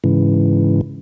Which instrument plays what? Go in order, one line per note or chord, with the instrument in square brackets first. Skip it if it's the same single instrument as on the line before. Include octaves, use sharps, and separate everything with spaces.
[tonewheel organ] G#2 C#3 E3